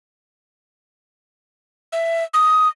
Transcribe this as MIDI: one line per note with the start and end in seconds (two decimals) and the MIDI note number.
1.92 2.23 76
2.34 2.68 87